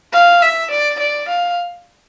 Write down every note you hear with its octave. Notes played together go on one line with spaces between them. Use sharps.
F5
E5
D5
D5
F5